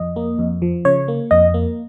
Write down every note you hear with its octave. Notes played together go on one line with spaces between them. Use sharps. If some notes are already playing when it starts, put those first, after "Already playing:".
Already playing: F2 D#5
A#3
F2
F3
C#3 C#5
A#3
F2 D#5
A#3